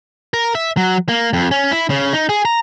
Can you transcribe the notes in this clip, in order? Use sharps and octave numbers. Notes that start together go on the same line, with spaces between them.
A#4
E5
F#3
A#3
F2
C#4
E4
C#3
D#4
G#4
A#5